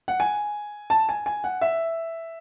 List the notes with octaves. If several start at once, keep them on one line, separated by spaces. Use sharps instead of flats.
F#5
G#5
A5
G#5
G#5
F#5
E5